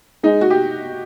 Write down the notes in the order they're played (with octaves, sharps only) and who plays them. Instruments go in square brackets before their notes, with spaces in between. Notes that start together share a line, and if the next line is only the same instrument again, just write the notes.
[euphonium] G#3 [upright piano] D#4
[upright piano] F#4
G4